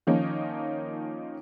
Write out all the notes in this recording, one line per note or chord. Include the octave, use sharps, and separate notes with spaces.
D#3 F3 A#3 C#4 D#4